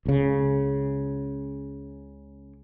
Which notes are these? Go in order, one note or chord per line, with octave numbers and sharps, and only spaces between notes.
C#2 C#3